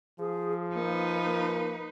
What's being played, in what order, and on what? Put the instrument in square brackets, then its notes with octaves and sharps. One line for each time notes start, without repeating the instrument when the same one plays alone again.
[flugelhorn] F3 [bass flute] G#4
[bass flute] A#3 [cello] D#4 B4
[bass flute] A#3